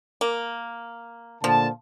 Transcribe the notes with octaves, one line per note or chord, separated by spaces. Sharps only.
A#3
A#2 D3 F3 A5